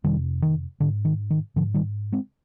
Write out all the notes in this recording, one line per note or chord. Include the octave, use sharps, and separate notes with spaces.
F2 C3 D#3 G3
D#3
G#2 D3
D#3
D#3
G#2 D3 F3
D#3 G3
G#3 C4